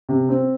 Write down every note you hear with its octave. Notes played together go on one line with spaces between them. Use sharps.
C3
C4